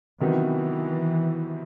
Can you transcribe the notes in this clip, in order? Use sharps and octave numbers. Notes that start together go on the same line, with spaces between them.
C3 D#3 E3 F#3 B3 D#4